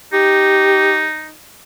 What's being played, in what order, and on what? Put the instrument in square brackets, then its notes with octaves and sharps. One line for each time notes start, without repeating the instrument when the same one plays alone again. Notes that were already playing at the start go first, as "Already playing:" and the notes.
[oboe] D#4 [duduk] G4